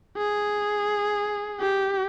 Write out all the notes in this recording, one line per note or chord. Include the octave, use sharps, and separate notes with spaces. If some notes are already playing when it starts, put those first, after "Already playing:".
G#4
G4